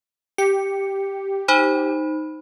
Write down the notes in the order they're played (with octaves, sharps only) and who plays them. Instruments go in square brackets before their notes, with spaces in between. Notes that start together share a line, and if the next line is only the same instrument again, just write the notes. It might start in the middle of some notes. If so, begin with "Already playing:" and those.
[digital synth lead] G4 [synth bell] C#7
[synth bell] D#4 C5 B5